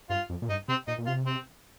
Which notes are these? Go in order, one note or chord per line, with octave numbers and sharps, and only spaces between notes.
G2 F4
F2
A#2
G2 D#4
C3 C4
A#2 D#4
A#2
C3 F4
C4